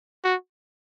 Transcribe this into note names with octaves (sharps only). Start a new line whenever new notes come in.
F#4